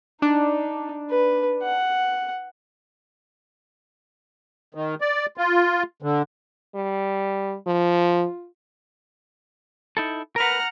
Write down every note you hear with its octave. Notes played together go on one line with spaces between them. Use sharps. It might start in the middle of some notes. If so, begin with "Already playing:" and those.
D4 D#4
B4
F#5
D#3
D5
F4
D3
G3
F3 F4
D#4 E4 A4
A#4 B4 F#5 A#5 F6